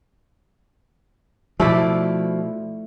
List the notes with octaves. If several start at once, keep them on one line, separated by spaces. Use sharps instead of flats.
B2 F3 A3 E4 D5